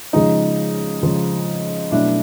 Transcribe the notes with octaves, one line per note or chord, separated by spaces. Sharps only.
C#3 F3 G#3 D#4
C#3 F3 G#3
B2 F#3 A3 D4 E4